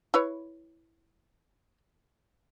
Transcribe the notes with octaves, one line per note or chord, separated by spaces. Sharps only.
E4 B4 C#5